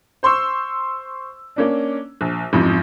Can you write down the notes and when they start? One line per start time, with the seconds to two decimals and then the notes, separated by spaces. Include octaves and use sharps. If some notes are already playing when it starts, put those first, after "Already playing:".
0.23 C5 C6 C#6 E6
1.56 A#3 C#4 D4
2.21 A#1
2.53 A1 F2 G#2